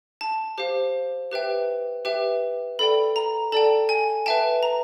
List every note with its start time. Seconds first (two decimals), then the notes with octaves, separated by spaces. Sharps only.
0.21 A5
0.58 G4 C5 F5
1.32 G4 B4 E5 G5
2.05 G4 B4 E5 G5
2.79 A4 D5 G5 B5
3.16 A#5
3.52 A4 D5 G5 A5
3.89 G#5
4.26 B4 E5 G5 A5
4.63 A#5